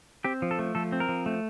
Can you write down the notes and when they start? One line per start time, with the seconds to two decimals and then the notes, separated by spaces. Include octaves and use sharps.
0.24 C4 G4
0.42 F3
0.51 A4
0.59 A3
0.75 F3 A4
0.92 C4
1.00 A#4
1.09 F3
1.26 A3